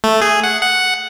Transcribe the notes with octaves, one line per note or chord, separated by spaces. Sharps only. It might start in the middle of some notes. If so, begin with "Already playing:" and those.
A3
G#4
F#5
F#5